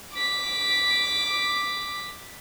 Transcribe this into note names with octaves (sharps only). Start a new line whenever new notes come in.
D6 B6